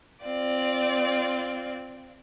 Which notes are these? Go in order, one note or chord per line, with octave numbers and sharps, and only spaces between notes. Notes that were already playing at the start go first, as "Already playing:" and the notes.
C4 F4 D5